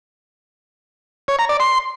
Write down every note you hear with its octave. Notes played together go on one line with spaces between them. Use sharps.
C#5
A#5
D5
C6